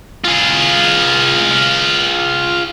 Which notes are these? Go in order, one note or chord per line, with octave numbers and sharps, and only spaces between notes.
F4 G#4